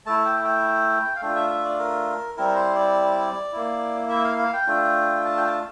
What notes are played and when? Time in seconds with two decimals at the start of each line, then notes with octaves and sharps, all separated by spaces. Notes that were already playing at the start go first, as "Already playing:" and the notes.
0.06 A3 E4 A5
0.25 G5
0.44 G5
1.16 F5
1.22 A3 D4 F4 G5
1.35 E5
1.51 E5
1.65 D5
1.79 A#4
2.37 G3 C4 E4 A#4
2.56 C5
2.75 D5
3.52 A#3 E4
4.10 E5
4.24 F5
4.39 F5
4.53 G5
4.67 A3 D4 F4
5.26 A5
5.37 G5
5.44 A5